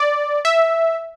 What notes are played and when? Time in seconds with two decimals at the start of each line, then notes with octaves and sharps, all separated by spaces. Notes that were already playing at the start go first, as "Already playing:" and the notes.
Already playing: D5
0.45 E5